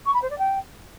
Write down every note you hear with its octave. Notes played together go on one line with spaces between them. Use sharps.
C#6
B5
C5
D5
G5